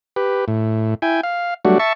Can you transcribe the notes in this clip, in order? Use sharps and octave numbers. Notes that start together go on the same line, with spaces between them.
G4 B4
A2
E4 G5 G#5
F5
F#3 G3 A3 D4 F#4
E5 A5 C#6